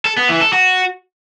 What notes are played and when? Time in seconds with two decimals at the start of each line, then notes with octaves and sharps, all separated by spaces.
0.05 A4
0.17 B3
0.29 E3
0.41 A4
0.53 F#4